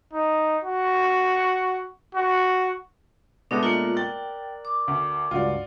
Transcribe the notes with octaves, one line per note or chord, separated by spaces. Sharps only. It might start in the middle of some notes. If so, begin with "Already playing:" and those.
D#4
F#4
F#4
B2 G#3 A3 B3 D4 D#5 F#5
A#3 F4 A#4 D5 F#6
G5 A6
D6
D2
C#2 G2 F4 F#4 D5